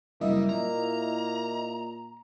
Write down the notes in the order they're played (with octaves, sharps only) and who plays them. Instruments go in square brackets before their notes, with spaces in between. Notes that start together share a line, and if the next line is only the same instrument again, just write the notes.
[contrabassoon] F#1 [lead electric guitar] G3 [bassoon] A#3 [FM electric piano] E4 D#5 E5
[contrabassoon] A#2 [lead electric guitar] A#5